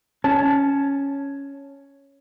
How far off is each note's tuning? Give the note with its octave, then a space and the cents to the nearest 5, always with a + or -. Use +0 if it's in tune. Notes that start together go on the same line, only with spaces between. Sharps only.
C#4 +0 A5 -15